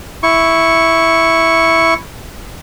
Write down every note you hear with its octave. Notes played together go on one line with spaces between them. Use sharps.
E4 C#6